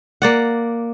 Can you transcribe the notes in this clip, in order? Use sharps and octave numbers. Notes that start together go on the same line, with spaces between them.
A#3 D5 F#5